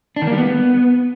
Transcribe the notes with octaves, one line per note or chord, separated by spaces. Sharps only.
D4
D#3
A#3
G3
B3